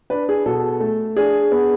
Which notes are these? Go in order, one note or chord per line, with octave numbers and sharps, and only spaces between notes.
D4 B4
G#4
B2 A4
A3
D4 G#4
B3